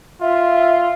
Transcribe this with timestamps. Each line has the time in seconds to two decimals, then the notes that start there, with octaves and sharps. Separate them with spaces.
0.21 F4 E5